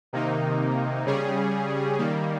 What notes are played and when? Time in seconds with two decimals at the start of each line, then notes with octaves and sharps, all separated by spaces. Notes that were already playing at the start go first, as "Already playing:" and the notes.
0.13 C3 D#3 A#3 D#4
1.06 C#3 G3 C#4 G#4
1.99 D#3 G3 A#3